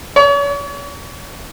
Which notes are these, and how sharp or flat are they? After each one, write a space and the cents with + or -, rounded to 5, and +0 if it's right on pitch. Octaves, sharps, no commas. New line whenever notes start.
C#5 +40